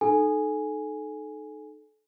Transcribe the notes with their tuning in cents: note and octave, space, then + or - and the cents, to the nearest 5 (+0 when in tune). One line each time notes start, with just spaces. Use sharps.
D#4 -25 A4 -30 G#5 +0